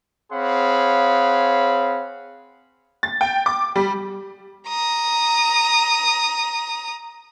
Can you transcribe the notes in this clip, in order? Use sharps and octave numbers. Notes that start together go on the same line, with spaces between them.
C4 G#4 C#5 F5 F#5 B5
A6
G5
D6
G3
A#5 D#6